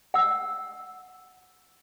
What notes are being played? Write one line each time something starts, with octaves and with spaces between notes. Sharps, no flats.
F#5 E6